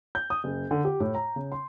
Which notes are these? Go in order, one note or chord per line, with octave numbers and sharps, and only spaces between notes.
G6
D#6
F#1
D3
G4
A2
A#5
C#3
C6